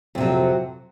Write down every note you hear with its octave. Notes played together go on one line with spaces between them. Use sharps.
F2 C3 F#3